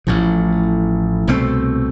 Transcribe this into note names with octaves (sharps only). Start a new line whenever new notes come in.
A1 A2 F3
C2 B2 A3 C4